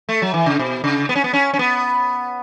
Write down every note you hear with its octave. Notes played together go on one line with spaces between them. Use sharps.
A3
F#3
E3
C#3
B2
C#3
B3
C#4
B3
C#4
C#4
B3